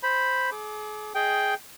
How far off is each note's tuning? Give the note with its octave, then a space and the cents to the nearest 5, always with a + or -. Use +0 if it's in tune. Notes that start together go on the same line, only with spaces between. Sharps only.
C5 +0 B5 +0
G#4 +40 D6 +0
G#4 +10 D#5 +0 G5 +0